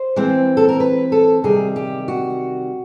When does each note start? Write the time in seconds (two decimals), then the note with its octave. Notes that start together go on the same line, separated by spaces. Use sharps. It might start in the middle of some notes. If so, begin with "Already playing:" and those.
Already playing: C5
0.16 E3 G#3 C4
0.57 A4
0.69 A#4
0.80 B4
1.12 A4
1.44 C3 D#3 G3 G#4
1.76 G4
2.08 F#4